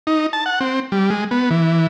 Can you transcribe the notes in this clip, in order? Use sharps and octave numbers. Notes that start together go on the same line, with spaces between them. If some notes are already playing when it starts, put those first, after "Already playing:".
D#4
A5
F#5
C4
G3
G#3
B3
E3